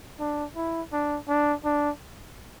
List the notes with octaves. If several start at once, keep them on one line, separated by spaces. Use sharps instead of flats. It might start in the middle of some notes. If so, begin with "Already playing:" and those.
D4
E4
D4
D4
D4